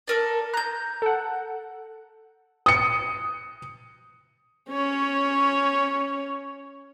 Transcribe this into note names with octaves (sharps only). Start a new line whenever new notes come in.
A4 A#4 D5
A#5 F#6 G6
A4 F#5
D#6 C#7
C#4 C#5